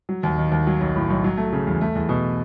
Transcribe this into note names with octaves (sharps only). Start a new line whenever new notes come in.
F#3
D#2
D#3
D#2
F#3
B1
A2
B1
F#3
A3
C#3
E2
A3
E2
B2